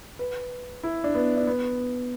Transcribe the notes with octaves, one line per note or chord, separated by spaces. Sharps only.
B4
E4
D4
B3
D4
B3